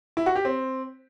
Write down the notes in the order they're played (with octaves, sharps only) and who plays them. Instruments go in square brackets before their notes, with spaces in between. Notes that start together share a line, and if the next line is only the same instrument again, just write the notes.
[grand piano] E4
F#4
G4
C4